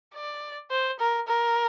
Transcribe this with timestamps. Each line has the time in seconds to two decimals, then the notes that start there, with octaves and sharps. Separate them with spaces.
0.15 D5
0.71 C5
1.00 A#4
1.28 A#4